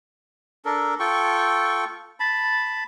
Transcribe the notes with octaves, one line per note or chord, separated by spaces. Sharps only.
D4 A4 A#4
F4 A4 G5 C#6
A5 B5